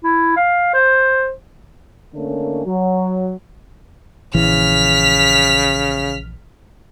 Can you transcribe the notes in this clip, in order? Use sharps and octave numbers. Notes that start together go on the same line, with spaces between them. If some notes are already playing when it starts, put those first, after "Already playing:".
E4
F5
C5
D3 D#3 A3 A#3 C#4
F#3
A#1 C#3 E3 F6 B6